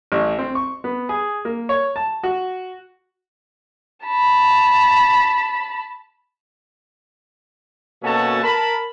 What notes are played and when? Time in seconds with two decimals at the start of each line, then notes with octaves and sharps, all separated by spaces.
0.12 A1
0.39 C4
0.55 C#6
0.84 B3
1.09 G#4
1.45 A#3
1.69 C#5
1.96 A5
2.23 F#4
4.05 A5 B5
8.03 B2 A#3 C#4 F#4 A4 A5
8.44 A#4 A5 B5